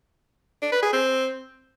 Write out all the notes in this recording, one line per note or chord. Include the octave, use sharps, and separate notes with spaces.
D4
B4
G#4
C4